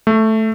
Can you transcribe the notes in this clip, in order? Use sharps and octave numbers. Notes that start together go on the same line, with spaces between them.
A3